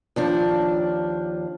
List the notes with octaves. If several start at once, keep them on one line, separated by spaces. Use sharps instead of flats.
D#2 F3 D4